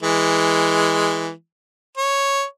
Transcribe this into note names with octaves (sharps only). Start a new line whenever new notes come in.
E3 G#3
C#5